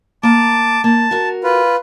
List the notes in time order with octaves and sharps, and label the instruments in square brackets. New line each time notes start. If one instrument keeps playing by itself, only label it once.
[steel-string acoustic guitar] A#3 A#5 [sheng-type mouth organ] A5 D6
[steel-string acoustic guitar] A#3 [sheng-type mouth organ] A5
[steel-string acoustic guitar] F#4 A#4
[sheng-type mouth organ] F4 B4